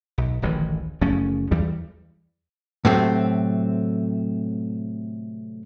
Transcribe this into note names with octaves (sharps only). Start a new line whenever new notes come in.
B1
D1 A1 D#3 E3
F#1 F3 A3 C#4
E2 E3 G3
A2 C3 F#3 A3 C4